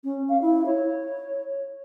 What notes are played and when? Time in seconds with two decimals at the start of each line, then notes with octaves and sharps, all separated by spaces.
0.04 C#4
0.29 F5
0.42 E4
0.66 C#5